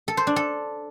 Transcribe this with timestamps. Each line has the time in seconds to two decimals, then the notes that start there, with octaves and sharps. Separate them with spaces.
0.08 A4
0.17 C5
0.27 D4
0.36 A4